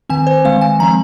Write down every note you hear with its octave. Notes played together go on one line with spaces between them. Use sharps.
D#3 C4 G#5
C5
D#3 G#3 C4 F5
G#5
F3 G#3 C4 A#5